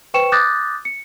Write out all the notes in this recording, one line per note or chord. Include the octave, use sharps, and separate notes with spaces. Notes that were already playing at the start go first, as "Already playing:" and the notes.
B4 C5 G5 C#6 C#7 E7
D6 D#6 F#6 G6 A6 A#6
C#7